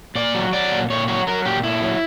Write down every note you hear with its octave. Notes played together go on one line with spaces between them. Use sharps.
A#2 D5
F#3
F#3 D5
A#2
A#2 C#5
F#3 C#5
F#3 A#4
A#2 G4
A#2 E4
F#3